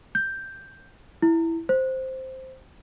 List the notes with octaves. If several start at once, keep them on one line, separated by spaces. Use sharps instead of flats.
G6
E4
C5